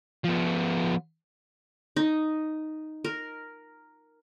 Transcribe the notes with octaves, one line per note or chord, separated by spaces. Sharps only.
F3 B3
D#4
A#4